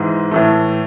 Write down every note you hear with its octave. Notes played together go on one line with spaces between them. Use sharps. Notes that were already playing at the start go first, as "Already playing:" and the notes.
Already playing: G#2 E3 G#3
A2 E3 A3